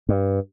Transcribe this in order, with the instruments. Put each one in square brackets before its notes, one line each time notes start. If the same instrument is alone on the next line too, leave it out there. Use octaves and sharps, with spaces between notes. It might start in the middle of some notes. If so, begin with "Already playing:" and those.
[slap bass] G2